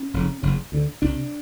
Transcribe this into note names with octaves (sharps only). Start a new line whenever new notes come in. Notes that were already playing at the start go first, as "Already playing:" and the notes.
Already playing: C#4
F1 F2 C#3
F#1 E2 C#3
D2 D3
C2 C3 D4